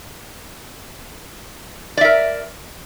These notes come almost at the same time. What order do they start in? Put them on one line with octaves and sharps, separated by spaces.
D5 E5 A#4